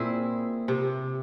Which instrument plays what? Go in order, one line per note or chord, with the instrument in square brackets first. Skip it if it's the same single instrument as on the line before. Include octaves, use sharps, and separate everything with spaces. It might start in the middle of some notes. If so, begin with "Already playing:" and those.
Already playing: [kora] A#2 [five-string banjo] C4 E4 G#4
[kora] C3